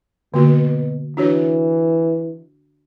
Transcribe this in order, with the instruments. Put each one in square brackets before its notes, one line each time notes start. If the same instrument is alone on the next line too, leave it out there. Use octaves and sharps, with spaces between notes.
[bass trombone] B2 [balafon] D3 A#3 F#4
[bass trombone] E3 [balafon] D4 F#4 C#5